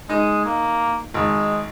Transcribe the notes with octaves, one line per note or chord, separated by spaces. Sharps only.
G#3 D#4
A#3
G#1 G#3